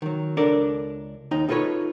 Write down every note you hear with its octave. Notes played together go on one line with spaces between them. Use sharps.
D#3 F#3
C#2 D4 A4 A#4 D5
D#2 D#4 G5
D#4 F4 A4 B4 C#5